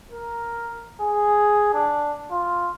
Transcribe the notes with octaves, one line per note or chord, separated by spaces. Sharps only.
A#4
G#4
D4
F4